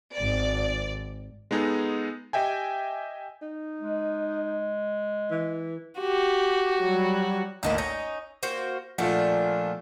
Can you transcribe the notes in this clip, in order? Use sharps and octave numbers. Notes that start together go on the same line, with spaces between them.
G#1 D5
G#3 B3 D#4 G#4 A4
G4 D#5 E5 G5 G#5
D#4
G#3
E3
F#4 G4
F#3 G3
G#1 D2 E3 A#3 D#5 A5
C#4 D#4 A#6
A#3 F#4 C5
A#2 F3 A3 D4 F4 F#5